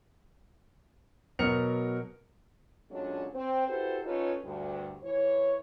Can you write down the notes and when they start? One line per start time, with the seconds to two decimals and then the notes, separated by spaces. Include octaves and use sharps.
1.39 B2 F#3 A#4 C#7 F7
2.91 A#2 F#3 G#3 A3 C#4 D4
3.34 C4
3.68 E4 F#4 G4 A4 B4 C5
4.04 C#4 D#4 F4 A4 B4 C#5
4.44 D2 G2
5.03 E3 C#5